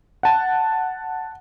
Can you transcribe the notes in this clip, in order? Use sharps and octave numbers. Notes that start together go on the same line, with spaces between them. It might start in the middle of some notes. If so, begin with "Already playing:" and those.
F#5 A5